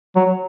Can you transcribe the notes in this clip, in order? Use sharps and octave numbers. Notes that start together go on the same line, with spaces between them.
F#3